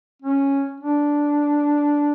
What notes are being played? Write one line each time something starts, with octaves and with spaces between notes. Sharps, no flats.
C#4
D4